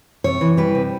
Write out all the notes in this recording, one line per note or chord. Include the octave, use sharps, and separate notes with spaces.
C3 C#5
E3
G3 B4
C3